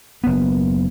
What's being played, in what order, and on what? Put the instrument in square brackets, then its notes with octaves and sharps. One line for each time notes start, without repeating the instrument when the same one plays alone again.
[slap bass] F#1 B3